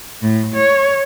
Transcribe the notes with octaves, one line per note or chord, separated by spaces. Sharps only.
A2
C#5